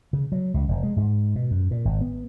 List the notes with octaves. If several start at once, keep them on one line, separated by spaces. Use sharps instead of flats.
C#3
F#3
C#2
F1
G#3
G#2
B2
F#2
A#2
G#1
B3